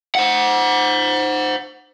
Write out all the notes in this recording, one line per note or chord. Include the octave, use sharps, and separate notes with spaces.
C5 F#5